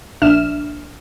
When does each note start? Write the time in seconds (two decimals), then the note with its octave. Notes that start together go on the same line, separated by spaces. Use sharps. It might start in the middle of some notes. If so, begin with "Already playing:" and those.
0.22 A#1 D4 E5 F6 E7